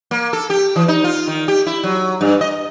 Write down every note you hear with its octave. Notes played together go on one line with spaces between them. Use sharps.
A#3
A4
G4
E3
D#4
F4
D#3
G4
E4
F#3
G2
D#5